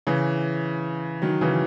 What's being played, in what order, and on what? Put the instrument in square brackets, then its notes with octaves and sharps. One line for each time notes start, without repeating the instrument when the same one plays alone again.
[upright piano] C#3 E3
D#3 F#3
C#3 E3